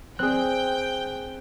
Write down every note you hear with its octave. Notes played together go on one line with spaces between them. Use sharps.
C4 G#4 G5 F#6